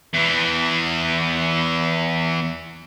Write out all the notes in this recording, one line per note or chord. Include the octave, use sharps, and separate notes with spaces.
E2 E3